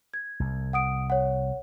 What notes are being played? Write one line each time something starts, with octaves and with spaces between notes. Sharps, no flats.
G#6
C2
F#5 D#6 D7
C#5 F#5